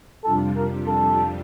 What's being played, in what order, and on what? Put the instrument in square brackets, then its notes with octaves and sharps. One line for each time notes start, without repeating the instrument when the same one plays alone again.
[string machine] F2 C3 G3 D4 F4 [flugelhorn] A4
[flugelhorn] A#4
A4